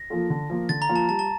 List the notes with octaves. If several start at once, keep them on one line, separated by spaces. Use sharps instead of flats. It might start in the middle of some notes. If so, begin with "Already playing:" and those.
Already playing: A#6
F3 A#3 F4 A4
D3
F3 A#3 F4
D3 A6
A#5
F3 A#3 F4
A5
G3 A5
A5